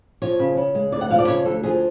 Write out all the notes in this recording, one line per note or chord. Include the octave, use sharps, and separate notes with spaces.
F3 C#5
C#3
C#3
G#3
D2 D5
F#5
F3 F5
D5
C#3 C#5
D2 A4
F3 G#4